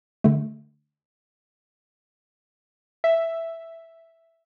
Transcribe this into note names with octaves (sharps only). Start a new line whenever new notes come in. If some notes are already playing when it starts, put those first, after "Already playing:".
D3 A3
E5